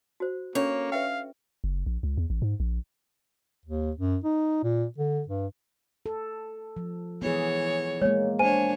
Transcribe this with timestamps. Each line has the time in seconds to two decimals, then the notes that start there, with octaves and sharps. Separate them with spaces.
0.20 F#4 C5
0.55 A#3 C#4 D4 A4 C#5
0.92 B4 E5 F5 G5
1.64 F#1
1.86 A#1
2.03 C#2
2.17 E2
2.30 A1
2.42 G#2
2.60 A#1
3.65 D#2
3.96 F#2
4.24 D#4
4.64 A#2
4.98 D3
5.28 G2
6.06 A4
6.77 F3
7.22 E3 B3 G#4 C#5
8.02 G#3 A#3 C#5
8.39 D4 C5 C#5 G#5 D#7